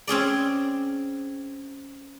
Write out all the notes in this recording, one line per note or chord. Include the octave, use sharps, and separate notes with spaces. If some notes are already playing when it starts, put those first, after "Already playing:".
C4 C#4 G#4 D5